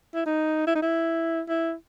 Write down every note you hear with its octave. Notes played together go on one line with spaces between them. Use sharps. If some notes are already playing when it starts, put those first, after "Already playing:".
E4
D#4
E4
D#4
E4
E4